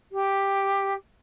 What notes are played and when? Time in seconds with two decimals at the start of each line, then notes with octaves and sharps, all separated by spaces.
0.12 G4